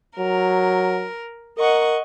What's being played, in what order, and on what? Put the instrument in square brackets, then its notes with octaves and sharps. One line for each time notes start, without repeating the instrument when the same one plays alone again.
[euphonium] F#3 [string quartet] A#4
[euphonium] A#4 [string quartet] D#5 F#5 C#6